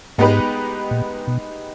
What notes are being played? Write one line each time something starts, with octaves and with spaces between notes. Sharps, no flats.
G#2 G#3 B3 D#4 G4 B4
A#2
B2